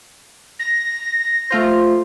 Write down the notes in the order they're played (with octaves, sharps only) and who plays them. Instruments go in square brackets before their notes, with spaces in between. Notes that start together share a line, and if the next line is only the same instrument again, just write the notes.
[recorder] A#6
[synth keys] A3 F4 C5